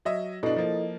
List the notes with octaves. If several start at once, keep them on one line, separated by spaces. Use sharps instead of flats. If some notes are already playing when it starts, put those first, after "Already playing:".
F#3 D#5 E5
B2 D4 E4 A4 D#5
F3 A#3